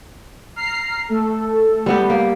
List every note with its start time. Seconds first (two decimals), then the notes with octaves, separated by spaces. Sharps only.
0.56 A#5 F6 C7
1.09 A3 A4
1.86 G3 B3 G4
2.10 A#3